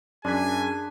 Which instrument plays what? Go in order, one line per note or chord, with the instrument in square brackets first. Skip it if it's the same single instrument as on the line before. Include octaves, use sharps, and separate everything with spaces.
[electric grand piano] F#2 F#6 B6 [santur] D4 [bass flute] G#4 [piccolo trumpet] G#5